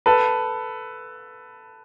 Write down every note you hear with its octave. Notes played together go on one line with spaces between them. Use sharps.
A4 B4